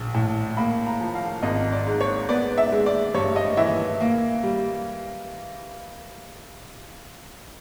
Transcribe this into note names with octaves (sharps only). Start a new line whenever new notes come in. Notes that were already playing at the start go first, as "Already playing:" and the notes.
Already playing: A#1
A2
A#3 B5
A#5
F3
F5
G#1 D#5
D5
G#2
C#5
B3 D5
E5
G#3
D5
G2 C#5
D#5
E3 E5
A#3
G3